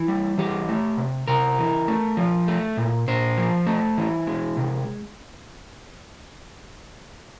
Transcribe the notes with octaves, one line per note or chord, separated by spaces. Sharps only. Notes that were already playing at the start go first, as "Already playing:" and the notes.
Already playing: E3
G3
E3 G4
A3
C3
C3 A#4
E3
A3
F3
A3
A#2
A#2 C5
F3
A3
E3
G#3
C3